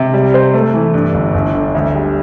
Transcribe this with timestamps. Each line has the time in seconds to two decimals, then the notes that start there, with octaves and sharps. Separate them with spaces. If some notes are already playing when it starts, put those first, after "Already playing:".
Already playing: C3
0.14 G3
0.34 C5
0.54 A3
0.74 E3
0.94 G2
1.14 G1
1.34 G1
1.54 D3
1.75 D2
1.95 G3